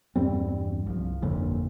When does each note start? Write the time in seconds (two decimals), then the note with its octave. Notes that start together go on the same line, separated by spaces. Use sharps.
0.16 E2 G2 G3 C4
0.87 C2 F3
1.22 G1 F2 A#2 D3